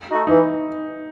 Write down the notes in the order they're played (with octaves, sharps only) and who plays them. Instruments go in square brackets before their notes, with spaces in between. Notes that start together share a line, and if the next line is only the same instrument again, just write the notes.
[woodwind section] A3 D#4 F#4
[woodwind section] E3 [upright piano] D#4